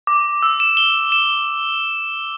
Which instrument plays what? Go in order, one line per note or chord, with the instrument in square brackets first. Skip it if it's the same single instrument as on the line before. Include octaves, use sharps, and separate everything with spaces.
[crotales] D6
E6
E7
G7
E7